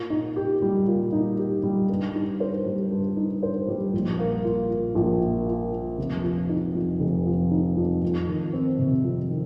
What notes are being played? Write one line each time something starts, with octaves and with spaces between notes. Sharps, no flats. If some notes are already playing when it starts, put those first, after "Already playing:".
Already playing: A#2
D#4
G4
G3
A#2
D#4
G4
G3
G2
D#4
C5
G3
G2
D#4
C5
G3
A#1
A#3
F4
A#2
A#1
A#3
F4
A#2
F1
F3
D#4
F2
F1
F3
D#4
F2
F2
D#3
C4
C3
F2
D#3